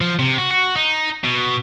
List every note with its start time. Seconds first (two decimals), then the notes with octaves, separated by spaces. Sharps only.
0.01 F3
0.19 C3
0.38 F#4
0.51 F#4
0.76 D#4
1.24 B2